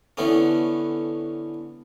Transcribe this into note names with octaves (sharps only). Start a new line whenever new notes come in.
D3 E3 A3 B3 C#4